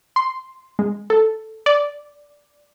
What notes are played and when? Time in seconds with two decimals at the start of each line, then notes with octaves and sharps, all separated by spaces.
0.16 C6
0.79 G#3
1.10 A4
1.66 D5